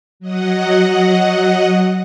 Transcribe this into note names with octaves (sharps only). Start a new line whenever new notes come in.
F#3 D#5 F#5